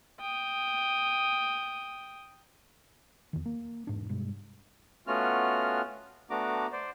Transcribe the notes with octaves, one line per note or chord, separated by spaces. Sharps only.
G5 D#6
E2 D#3
A#3
E1 G#2 D4
G2 B2 G#3
A3 B3 C#4 F4 F#4 F6
A3 B3 D4 F#4 A#5 D6
C5 D5